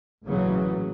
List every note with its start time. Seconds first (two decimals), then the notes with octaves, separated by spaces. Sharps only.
0.24 A1 A#2 C#3 E3 F#3